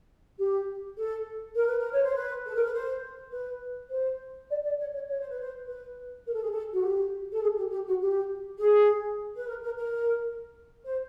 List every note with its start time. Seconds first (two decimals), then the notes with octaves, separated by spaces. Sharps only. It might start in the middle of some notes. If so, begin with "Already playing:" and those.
0.38 G4
0.96 A4
1.55 A#4
1.66 B4
1.78 A#4
1.92 C#5
2.03 C5
2.14 B4
2.45 A4
2.54 A#4
2.63 B4
2.72 C5
3.31 B4
3.90 C5
4.49 D5
4.63 D5
4.77 C#5
4.93 C#5
5.07 C#5
5.19 C5
5.29 B4
5.40 C5
5.66 B4
6.24 A#4
6.33 A4
6.41 G#4
6.50 A4
6.72 F#4
6.83 G4
7.31 A4
7.42 G#4
7.57 G4
7.71 G4
7.86 F#4
8.01 G4
8.59 G#4
9.36 B4
9.47 A#4
9.62 A#4
9.77 A#4
10.84 C5